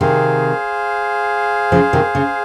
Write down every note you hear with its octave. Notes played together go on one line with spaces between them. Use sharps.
C3 D#3 G#4 C5 F5
C#3 F3
C3 D#3
C#3